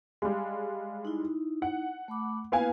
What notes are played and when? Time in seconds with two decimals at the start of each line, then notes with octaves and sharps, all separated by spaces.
0.22 G3 G#3 F5
1.05 D#4 E4
1.62 F#5
2.08 A3 B5 D6
2.52 A#3 B3 E4 B4 F5 G#5